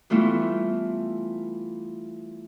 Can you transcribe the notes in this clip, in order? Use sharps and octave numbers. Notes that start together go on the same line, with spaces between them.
E3 G3 A3 B3 E4 F4